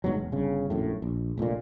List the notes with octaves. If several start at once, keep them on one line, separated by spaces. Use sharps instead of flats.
G1 G#2 B2 F#3
E1
G1 C#3
A#1 F#2 A2
A#1
F1 A#1 F2 A#2